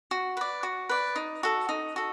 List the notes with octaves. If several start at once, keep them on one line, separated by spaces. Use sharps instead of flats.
F#4
B4 D5
F#4
B4 D5
D#4
F#4 A4
D#4
F#4 A4